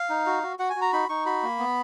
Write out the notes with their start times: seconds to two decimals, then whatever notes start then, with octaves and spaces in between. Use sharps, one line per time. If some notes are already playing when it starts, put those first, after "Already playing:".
Already playing: F5
0.10 D#4
0.26 F#4
0.43 F#4
0.59 F#4 F#5
0.70 G#5
0.76 F#4
0.81 A#5
0.93 D#4 B5
1.09 D#4 C#6
1.25 F#4 B5
1.43 A#3
1.59 B3